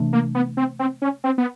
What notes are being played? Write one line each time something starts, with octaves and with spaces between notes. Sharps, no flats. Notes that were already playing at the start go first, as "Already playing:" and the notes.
Already playing: C3 E3 A3 D4
A#3
B3
C4
C4
C#4
C4
B3